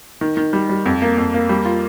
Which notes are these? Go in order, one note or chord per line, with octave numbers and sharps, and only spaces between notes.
D#3
D#3
G3
G3
F2
A#3
F2
A#3
G3
F4